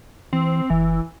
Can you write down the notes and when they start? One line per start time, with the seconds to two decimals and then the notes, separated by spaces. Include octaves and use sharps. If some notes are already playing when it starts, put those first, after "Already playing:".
0.33 E3 C4
0.70 F#1 E3